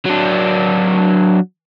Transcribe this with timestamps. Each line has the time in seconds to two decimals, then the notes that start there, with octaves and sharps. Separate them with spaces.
0.06 F#3 D4